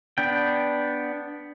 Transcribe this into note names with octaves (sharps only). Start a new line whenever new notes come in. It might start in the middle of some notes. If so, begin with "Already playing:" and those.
B3 D4 G5